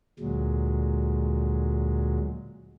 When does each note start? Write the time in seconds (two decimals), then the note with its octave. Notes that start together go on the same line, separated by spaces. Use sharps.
0.20 D2 A#2 F#3 G#3